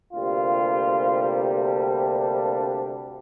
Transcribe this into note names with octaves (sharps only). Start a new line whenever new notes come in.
D2 C3 G3 A#3 F4
D4